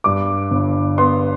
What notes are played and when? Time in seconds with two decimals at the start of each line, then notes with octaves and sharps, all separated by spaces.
0.04 G2 D6
0.51 G1
0.98 B3 C6